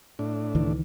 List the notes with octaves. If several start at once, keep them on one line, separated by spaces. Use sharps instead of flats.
A2 D4
C#2 D#3 E3